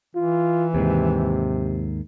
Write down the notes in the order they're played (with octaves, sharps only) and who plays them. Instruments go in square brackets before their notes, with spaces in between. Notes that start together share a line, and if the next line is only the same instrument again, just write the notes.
[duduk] E3 [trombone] F4
[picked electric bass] D#2 G#2 [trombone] C3